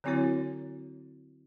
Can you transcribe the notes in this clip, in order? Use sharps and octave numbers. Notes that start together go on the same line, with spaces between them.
D3 F#3 C4 E4 F#4 C#5